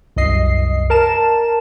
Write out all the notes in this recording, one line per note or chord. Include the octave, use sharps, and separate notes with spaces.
C2 F#2 D#5 C7
A#4 A5 E7